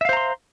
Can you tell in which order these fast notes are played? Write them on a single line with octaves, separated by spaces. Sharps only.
E5 F5 C5 A#5 C6